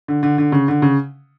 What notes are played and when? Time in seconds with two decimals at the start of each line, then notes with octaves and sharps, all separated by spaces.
0.08 D3
0.23 D3
0.38 D3
0.52 C#3
0.68 D3
0.82 C#3